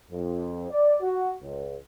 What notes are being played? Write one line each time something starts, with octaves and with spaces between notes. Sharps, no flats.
F2
D5
F#4
C#2